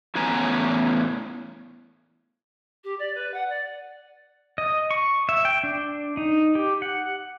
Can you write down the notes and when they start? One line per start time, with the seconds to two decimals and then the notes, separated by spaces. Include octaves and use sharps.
0.15 E2 A2 B3 C#4 G#5 A#5
2.84 G4
2.99 D5
3.14 B4
3.33 F#5
3.49 D5
4.58 D#5
4.91 C#6
5.29 E5
5.45 G5
5.64 D4
6.17 D#4
6.55 G4
6.82 F#5